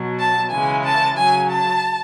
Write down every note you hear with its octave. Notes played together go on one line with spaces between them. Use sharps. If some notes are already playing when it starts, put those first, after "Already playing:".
Already playing: B2 F#3
A5
C#3 E3 G#3 G#5
A5
C#3 F#3 G#5
A5